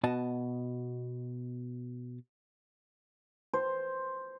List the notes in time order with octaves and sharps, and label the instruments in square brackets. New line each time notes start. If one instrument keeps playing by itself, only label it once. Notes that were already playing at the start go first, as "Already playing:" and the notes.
[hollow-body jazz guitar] B2 F#4 D#5 A5
[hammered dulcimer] C5